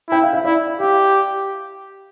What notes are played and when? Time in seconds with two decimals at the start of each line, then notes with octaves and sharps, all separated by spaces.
0.09 E4 G5
0.23 F5
0.33 E5
0.44 E4 D5
0.80 G4 F5